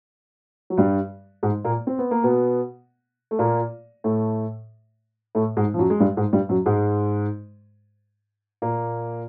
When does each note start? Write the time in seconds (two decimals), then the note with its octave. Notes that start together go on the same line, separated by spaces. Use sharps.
0.70 F#3
0.77 G2 G3
1.43 G#2 G#3
1.64 A#2 A#3
1.87 C4
1.98 B3
2.11 A#3
2.23 B2 B3
3.31 A3
3.39 A#2 A#3
4.04 A2 A3
5.35 A2 A3
5.57 G#2 G#3
5.74 F3
5.79 F#2 F#3
5.90 G#3
6.00 G2 G3
6.17 G#2 G#3
6.33 G2 G3
6.49 F#2 F#3
6.66 G#2 G#3
8.62 A#2 A#3